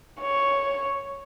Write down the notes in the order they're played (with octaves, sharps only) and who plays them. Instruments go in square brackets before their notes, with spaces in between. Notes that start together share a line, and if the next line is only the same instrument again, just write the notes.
[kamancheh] C#5